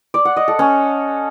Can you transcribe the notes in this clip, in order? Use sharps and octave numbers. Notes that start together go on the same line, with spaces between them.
D5
F#5
D#5
A4
C#4